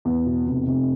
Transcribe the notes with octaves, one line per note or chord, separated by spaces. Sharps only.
E2
B2
F1
F1